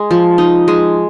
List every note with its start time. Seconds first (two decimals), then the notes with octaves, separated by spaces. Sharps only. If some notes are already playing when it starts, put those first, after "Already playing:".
Already playing: G#3
0.11 F3
0.38 D#4
0.68 G#3